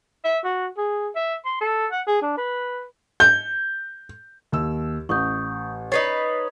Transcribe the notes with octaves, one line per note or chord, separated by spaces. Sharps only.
E5
F#4
G#4
E5
C6
A4
F#5
G#4
D4
B4
G6
D#2 E6
A1 C#6 D#6 G6
D#4 B4 C#5 G#6 A6 C7